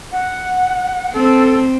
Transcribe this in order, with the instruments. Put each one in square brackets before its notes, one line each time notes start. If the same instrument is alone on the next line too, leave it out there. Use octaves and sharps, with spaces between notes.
[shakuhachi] F#5
[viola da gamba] C4 [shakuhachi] A4